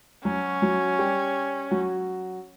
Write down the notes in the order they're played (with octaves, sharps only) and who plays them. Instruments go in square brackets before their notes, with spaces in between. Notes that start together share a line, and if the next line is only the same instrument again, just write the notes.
[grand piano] F#3 F#4 [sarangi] C#4
[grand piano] F#3 F#4
G3 G4
F#3 F#4